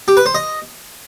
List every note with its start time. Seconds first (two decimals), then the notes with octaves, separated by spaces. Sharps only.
0.08 G4
0.17 B4
0.26 C5
0.35 D#5